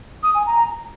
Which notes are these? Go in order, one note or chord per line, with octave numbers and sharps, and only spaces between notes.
D#6
G#5
A#5